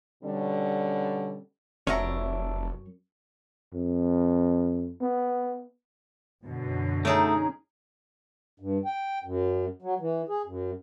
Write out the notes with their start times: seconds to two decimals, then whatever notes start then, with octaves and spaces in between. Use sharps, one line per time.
0.22 B2 D3 G3 C#4
1.87 F1 F#2 C#4 D4 E4 C#5 A#5
3.74 F2
5.01 B3
6.45 F#2 B2 D3
7.05 A3 C#4 D#4 G#4 A#4
8.60 G2
8.85 G5
9.24 F#2
9.82 F#3
10.00 E3
10.29 G#4
10.46 F#2